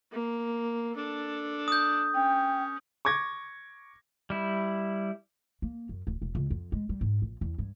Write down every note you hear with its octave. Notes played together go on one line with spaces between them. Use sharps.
A#3
D4 A4
D#6 G6
C#4 G5
C#6 D6 G#6 A#6
G3 E4
A#3
F#2
D1
E1
C#2
F2
G#3
G3
G#2
A#1
E2
G2